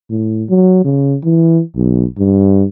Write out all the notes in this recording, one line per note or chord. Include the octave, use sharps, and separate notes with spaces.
A2
F#3
C#3
E3
B1
G2